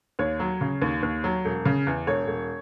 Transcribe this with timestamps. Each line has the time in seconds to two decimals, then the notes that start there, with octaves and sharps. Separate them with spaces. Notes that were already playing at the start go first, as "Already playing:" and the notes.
0.19 D#2 C#5
0.40 F#3
0.61 C#3
0.82 D#2
1.03 D#2
1.24 F#3
1.45 E1
1.65 C#3
1.87 E2
2.07 E1 C#5
2.27 E1